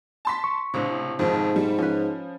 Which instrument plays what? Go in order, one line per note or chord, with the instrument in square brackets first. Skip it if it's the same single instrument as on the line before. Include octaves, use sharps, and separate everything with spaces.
[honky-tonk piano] A5 C6 B6
[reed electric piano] C#6
[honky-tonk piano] C#2 A2 [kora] C3 D4
[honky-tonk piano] F2 D#3 [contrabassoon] G#2 [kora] F3
[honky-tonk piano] G3
[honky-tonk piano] F3 [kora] C#4 B4